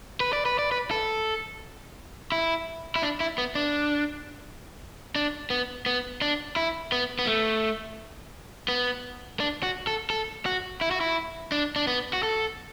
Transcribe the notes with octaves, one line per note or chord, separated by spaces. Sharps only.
B4
D5
B4
D5
B4
A4
E4
E4
D4
E4
B3
D4
D4
B3
B3
D4
E4
B3
B3
A3
B3
D4
F#4
A4
A4
F#4
E4
F#4
E4
D4
D4
B3
F#4
A4